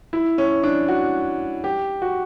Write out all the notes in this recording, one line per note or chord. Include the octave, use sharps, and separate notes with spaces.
E4
C#4
D4
F#4
G4
F#4